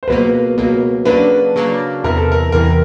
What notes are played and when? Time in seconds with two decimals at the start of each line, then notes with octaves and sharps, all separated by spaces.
0.03 C5
0.08 C#2 B2 F#3 A#3 B4
0.57 C#2 B2 F#3 A#3
1.05 C#3 F#3 A#3 D4 B4
1.56 C#3 F#3 A#3 D4
2.04 E2 C3 E3 A#4
2.17 A4
2.32 A#4
2.52 E2 C3 E3 A#4